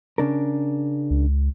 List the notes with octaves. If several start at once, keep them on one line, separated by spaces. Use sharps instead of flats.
C#3 D4 A#4
C#2